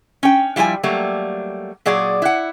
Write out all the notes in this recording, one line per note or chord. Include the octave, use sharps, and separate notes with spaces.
C#4 G5
F3 G3 E4 B4 G#5
F#3 G3 A3 A#3
A#2 F#3 G#4 D5
E4 F#5